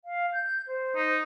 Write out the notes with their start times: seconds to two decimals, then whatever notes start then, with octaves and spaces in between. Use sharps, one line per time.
0.05 F5
0.33 G6
0.67 C5
0.96 D#4